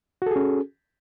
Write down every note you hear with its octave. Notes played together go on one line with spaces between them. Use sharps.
C#4 F#4 G#4 A4